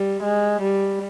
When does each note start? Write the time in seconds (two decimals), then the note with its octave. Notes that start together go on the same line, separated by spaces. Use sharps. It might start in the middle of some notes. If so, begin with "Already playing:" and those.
Already playing: G3
0.23 G#3
0.62 G3